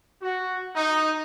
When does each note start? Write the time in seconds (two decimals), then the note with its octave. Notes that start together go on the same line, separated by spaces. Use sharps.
0.22 F#4
0.76 D#4